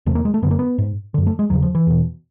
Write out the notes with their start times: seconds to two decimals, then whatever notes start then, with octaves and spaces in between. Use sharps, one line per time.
0.06 E2 C3 A3
0.15 A#3
0.25 G#3
0.34 A3
0.42 F#2 D3 B3
0.51 A#3
0.59 B3
0.78 G#2
1.14 F#2 D3
1.27 A3
1.39 G#3
1.50 E2 C#3 F#3
1.63 F3
1.75 E3
1.87 E2 B2